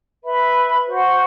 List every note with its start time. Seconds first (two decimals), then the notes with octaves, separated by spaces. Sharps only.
0.22 B4 E5 B5
0.85 F#4 C5 F#5 C6